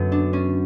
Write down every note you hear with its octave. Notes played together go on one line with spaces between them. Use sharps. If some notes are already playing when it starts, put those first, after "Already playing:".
Already playing: F#2 D3 F#3 B3
D4
C#4